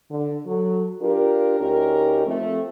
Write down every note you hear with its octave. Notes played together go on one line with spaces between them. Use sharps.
D3
F#3 A4
D4 F4 G4 A#4
D2 C#4 D#4 G4 A#4
F3 A3 C4